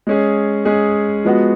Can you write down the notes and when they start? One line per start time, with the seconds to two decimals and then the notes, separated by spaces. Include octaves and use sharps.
0.07 G#3 C#4 G#4
0.65 G#3 C#4 G#4
1.24 F3 G#3 B3 F#4